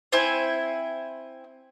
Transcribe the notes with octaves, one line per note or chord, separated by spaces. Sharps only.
C4 E4 E5 G#5